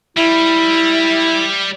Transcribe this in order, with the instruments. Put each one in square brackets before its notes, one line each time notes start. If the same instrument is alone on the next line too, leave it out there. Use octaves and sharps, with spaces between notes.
[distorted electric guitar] G3 [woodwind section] E4